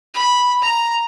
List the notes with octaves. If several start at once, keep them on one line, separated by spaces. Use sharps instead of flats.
B5
A#5